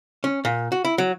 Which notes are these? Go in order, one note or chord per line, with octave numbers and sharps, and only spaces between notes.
C#4
A#2
F#4
E4
F#3